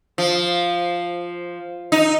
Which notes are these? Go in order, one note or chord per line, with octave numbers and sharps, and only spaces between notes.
F3
D#4